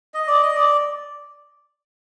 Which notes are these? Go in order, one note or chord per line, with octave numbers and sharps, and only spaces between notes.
D#5
D5
D#5
D5